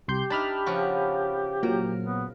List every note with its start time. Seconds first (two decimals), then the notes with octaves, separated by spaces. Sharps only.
0.08 C2 G4 C6 G6
0.30 D4 D#4 E5 A5 B5 F6
0.66 C#3 F3 F#4
1.63 A#2 F#3 A#4
2.03 B3